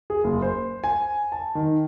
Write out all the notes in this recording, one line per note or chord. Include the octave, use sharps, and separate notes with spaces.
G#4
F#1
C5
G#5
A5
D#3